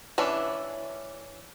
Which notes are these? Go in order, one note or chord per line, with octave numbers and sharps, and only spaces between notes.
E3 C#4 D4 E4